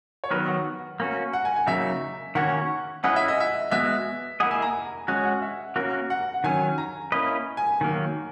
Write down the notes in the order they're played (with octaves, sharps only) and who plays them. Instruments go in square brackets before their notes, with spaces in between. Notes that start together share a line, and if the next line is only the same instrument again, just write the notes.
[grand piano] C#5
[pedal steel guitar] D#3 F#3 B3 F#4 A#4 [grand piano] B4
[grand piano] F#5
[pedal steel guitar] A#3 C#4 F#4
[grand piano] F#5
G#5
G#5
[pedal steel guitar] C#3 F#3 A#3 D#4 [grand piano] E5
[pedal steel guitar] D#3 A#3 C#4 F#4 C#5 [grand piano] F#5
[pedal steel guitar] C#4 E4 G#4 B4 D#5 [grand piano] F#5
[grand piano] E5
D#5
E5
[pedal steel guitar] G#3 B3 F#4 [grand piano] E5
[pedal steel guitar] A#3 E4 G#4 D#5 [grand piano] F#5
[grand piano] G#5
A#5
[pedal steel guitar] G#3 C#4 F#4 [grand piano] G#5
[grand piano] F#5
E5
[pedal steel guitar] A#3 C#4 F#4 A#4
[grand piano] F#5
F#5
[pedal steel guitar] D#3 F#3 C#4 [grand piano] G#5
[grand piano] A#5
[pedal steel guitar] A#3 C#4 E4 B4 D#5
[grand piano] G#5
[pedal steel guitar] D#3 F#3 A#3